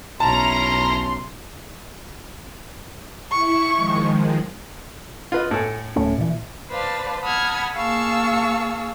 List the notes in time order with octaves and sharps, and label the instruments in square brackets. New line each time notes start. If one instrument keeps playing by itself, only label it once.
[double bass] B1 [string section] C#4 E4 A#5 [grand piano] A5 [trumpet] C6
[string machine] E4 [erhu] C#6
[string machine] D#3 F3 G#3
[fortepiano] F4 B4 D#5
A2 A4 G#5
[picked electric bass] D1 A3 C#4
A#2 E3
[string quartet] B4 C5 D5 F5 A5
F#5 A5 B5 D#6 F6 G#6
A#3 G#4 F5 A5 C#6 E6